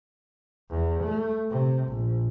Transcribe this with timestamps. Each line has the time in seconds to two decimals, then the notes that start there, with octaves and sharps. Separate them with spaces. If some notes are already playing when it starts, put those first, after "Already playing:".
0.71 E2
1.04 A3
1.51 C3
1.88 A#1